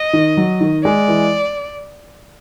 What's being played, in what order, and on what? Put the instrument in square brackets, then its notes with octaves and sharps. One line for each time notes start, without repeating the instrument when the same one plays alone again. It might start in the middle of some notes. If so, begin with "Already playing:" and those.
Already playing: [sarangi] D#5
[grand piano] D#3
F#3
D#3
[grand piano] G#3 [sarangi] D5
[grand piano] E3